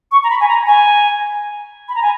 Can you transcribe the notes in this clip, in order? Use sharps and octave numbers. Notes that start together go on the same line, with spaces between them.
C#6
A#5
B5
G#5
A#5
G#5
B5
A#5
G#5